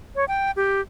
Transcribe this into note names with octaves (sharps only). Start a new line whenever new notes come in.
C#5
G5
G4